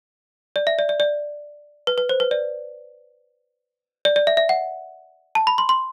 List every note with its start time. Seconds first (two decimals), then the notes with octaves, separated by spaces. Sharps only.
0.56 D5
0.67 E5
0.79 D5
0.89 D5
1.00 D5
1.87 B4
1.98 B4
2.09 C5
2.20 B4
2.31 D5
4.05 D5
4.16 D5
4.27 E5
4.37 E5
4.49 F#5
5.35 A5
5.47 B5
5.58 C6
5.69 C6